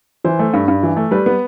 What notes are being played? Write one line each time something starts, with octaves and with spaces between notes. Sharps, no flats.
E3 C5
A3
G2
G2
E3
A3
G3 B4
B3